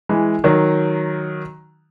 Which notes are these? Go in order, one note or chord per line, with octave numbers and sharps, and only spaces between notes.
E3 G#3
D#3 F#3